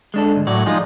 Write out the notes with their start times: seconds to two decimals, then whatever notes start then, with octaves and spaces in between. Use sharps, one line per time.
0.14 G#3 D4 A4
0.34 D2 G#2
0.47 A2 F#3 D5
0.66 F3 G#3 D#4